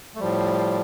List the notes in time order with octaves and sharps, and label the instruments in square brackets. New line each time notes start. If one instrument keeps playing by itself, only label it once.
[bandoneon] A3
A2 F3 G3